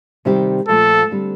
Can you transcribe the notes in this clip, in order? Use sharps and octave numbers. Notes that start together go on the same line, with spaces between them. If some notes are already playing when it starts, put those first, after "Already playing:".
C3 D#3 G3 C4 G4
A#2 F3 A3 A4
D3 G3 C4